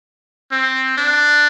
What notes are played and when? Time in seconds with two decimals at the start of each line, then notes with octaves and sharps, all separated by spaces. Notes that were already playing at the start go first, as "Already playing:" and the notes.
0.51 C4
0.98 D4